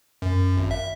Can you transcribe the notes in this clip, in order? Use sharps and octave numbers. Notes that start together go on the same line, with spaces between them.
F#2
G#1
E5